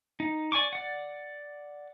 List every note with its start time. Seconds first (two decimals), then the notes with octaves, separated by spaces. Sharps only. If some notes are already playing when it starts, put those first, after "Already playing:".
0.20 D#4
0.52 D5 G#5 C#6 D6
0.73 D5 F#5